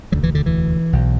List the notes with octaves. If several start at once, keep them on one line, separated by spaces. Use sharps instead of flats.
E1 D2 D3 F#3
E3
D3
E3
B1 B2